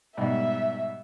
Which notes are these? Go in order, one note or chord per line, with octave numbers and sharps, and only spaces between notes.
G#2 B2 G3 E5